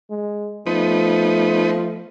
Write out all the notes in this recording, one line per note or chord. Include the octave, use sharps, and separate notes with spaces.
G#3
F3 A3 B3 D#4